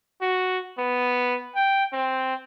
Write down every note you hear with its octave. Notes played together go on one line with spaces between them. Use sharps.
F#4
B3
G5
C4